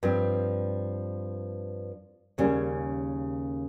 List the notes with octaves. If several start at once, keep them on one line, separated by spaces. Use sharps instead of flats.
G2 F3 C4
D#2 C#3 G3 C#4